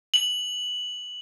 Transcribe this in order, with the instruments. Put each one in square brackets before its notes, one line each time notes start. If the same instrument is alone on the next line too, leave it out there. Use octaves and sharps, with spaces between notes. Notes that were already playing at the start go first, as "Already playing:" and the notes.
[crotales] F#7